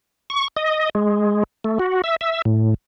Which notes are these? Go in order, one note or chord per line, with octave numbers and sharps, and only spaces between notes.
C#6
D#5
G#3
A3
F#4
E5
E5
A2